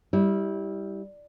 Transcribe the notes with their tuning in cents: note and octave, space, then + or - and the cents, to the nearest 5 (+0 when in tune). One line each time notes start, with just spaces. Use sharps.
G3 +0 E4 -20